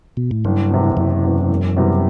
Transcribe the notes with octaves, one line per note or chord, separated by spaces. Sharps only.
B2
A2
F#1 G2
E2 C3
F#1 F#2
E2 C3
E1
E2 C3 G3